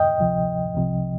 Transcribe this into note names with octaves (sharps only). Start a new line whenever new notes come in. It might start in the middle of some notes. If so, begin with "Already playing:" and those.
Already playing: D#5 G5
D2 C3 F3
C2 C3 F3